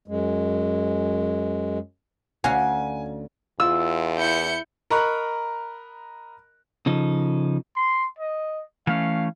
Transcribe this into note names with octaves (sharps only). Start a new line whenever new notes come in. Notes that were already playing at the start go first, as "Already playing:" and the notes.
F#2 G#3
D2 C#4 F#4 F5 G#5
E2 F4 E6
E4 G6 C#7
A#4 D#5 A#5 B5 C#6 F#6
C#3 F3 D#4 A4
C6
D#5
E3 A3 C#4 F5